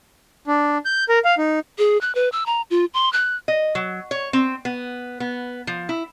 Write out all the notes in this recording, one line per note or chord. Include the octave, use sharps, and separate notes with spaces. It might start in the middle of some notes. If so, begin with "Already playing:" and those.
D4
G6
A#4
F5
D#4
G#4
F#6
B4
E6
A#5
F4
C6
F#6
D#5
F#3
C#5
C4
B3
B3
F3
E4